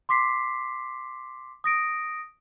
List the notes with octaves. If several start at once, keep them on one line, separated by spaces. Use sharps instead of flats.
C6 D6 B6 C7
D#6 A#6 D7